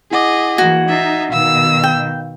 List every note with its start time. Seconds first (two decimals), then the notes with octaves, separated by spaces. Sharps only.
0.11 E4 G#4 D#5 F#5 D6
0.58 E3 A#3 F#4 G#6
0.88 D#4 E5 G#6 A6 C7
1.32 B2 D#3 F5 E6
1.84 G5